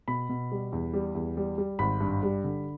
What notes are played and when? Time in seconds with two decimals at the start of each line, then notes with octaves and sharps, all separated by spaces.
0.08 B2 B5
0.29 B2
0.52 G3
0.72 E2
0.93 G3
1.15 E2
1.37 G3
1.58 G3
1.79 G#1 B5
2.01 G2
2.23 G3
2.44 D3